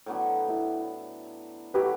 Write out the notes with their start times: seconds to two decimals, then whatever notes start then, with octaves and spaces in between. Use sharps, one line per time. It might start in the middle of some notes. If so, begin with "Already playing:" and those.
0.06 A2 F#3 B3 D4
0.48 E4
1.74 F#3 A3 E4 G4 B4